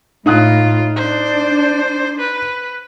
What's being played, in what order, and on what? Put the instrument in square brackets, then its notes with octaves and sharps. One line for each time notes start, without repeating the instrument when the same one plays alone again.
[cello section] A2 [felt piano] D#4 D#6 F#6 [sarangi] F4
[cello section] D4 [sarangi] C5
[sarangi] B4